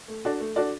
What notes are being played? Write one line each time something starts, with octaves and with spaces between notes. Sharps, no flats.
A3
D4 F#4 A4 D5
A3
D4 F#4 A4 D5